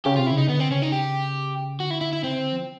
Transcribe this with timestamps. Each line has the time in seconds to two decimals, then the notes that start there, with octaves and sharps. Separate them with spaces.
0.05 C#3 G4
0.16 C3 F4
0.27 E4
0.32 C#3
0.38 D#4
0.49 D3 B3
0.60 C4
0.71 C#3 C#4
0.82 D#4
0.92 G4
1.79 D3 F#4
1.90 E4
2.01 E4
2.13 E4
2.24 C#3 C4
2.38 D3
2.52 F3